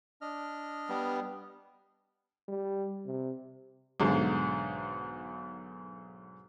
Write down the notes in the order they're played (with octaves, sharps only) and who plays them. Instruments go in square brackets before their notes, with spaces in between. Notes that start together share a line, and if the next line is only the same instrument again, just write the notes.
[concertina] D4 D#5 F6
[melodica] G3 B3
[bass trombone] G3
C3
[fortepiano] B1 G#2 D3